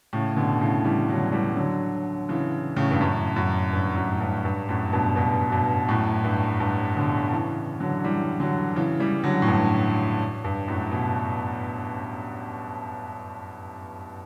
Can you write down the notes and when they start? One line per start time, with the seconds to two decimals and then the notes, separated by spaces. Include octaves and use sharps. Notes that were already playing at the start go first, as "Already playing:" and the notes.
0.13 A2 C#3
0.37 B2 D3
0.61 A2 C#3
0.85 E3 G3
1.09 D3 F#3
1.32 E3 G3
1.57 D3 F#3
2.29 C#3 E3
2.76 A2 C#3
2.91 G2
3.01 F#2 A2
3.36 F#2
3.73 G2
3.96 F#2
4.11 A2
4.21 G2
4.45 G2
4.69 F#2 A2
4.93 G2 B2
5.16 G2 B2
5.52 G2 B2
5.88 F#2 A2
6.24 G2
6.60 G2
6.96 B2 D3
7.32 C#3 E3
7.80 D3 F#3
8.04 E3 G3
8.40 D3 F#3
8.76 C#3 E3
9.00 E3 G3
9.24 D3 F#3
9.42 A2
9.48 G2
10.44 G2
10.68 F#2 A2
10.91 B2